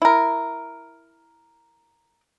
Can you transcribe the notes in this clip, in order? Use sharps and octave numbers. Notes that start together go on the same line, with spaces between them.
E4 A#4